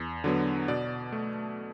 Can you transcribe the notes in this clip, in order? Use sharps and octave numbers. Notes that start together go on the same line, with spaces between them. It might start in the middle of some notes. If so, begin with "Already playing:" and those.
Already playing: E2
D3 F#3 B3
B2 D5
A3